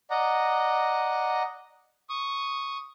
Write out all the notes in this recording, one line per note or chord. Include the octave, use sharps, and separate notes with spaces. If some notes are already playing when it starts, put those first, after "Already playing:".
D5 D#5 F#5 A#5
C#6 D#6